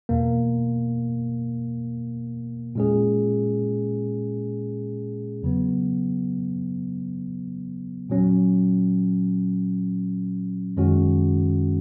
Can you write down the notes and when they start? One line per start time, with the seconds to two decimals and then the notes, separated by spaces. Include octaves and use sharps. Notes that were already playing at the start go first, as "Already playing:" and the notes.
0.09 E2 B2 A#3
2.75 A#2 G#3 C#4 G#4
5.43 E2 C#3 F#3 B3
8.10 A#2 F#3 C#4
10.77 F#2 D#3 G#3 C#4 F#4